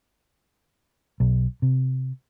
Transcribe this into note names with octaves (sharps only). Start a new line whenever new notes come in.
B1
C3